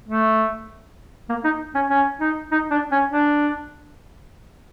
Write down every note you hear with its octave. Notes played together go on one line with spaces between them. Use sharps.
A3
A#3
D#4
C#4
C#4
D#4
D#4
D4
C#4
D4